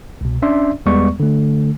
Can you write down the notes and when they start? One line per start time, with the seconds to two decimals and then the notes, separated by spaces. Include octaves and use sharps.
0.21 C2 B2
0.42 C#4 D4 D5 E5 C6
0.86 E2 G3 G#3 B3 D5 C#6
1.20 D3 A3